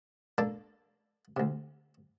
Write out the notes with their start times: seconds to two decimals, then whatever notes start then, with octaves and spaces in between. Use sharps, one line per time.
0.38 A#3 D4 A4 D5
1.37 D2 C3